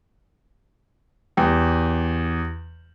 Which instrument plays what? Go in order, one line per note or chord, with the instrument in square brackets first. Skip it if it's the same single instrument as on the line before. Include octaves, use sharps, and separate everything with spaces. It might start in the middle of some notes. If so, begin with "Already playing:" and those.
[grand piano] E2 G4